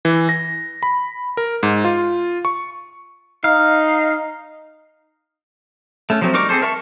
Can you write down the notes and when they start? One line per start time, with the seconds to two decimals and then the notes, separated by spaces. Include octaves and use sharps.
0.05 E3
0.29 A#6
0.83 B5
1.37 A#4
1.63 G#2
1.85 F4
2.45 C#6
3.44 D#4 F5
6.10 A3 C#4
6.21 F3 F#3 A3 C4
6.34 G3 D#4 A#4 C#6 D6
6.49 C4 G#4 A4 C5
6.62 A#4 E5 A5 C#6